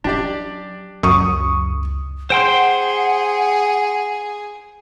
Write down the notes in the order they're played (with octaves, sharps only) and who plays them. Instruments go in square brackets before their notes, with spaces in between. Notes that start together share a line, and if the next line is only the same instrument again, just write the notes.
[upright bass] F#3 C#4 [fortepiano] D4 G4 D5
[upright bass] C#2 [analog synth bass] F#2 [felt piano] C#6 D#6
[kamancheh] G#4 [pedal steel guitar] C5 G5 C6 [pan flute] F#5